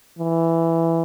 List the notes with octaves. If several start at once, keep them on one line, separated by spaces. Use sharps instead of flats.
E3